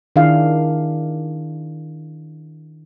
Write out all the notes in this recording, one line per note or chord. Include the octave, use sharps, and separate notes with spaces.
D#3 D4 E4 G#4 F5